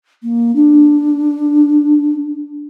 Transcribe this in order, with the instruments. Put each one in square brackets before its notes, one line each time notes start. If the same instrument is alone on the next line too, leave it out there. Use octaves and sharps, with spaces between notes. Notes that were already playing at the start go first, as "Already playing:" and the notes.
[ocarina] A#3
D4